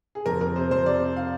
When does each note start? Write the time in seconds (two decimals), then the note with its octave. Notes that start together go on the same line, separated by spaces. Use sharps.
0.15 G#4
0.26 F2 A#4
0.41 F2 A#4
0.56 C3 C5
0.71 F2 C5
0.86 C3 D5
1.01 C3
1.16 F5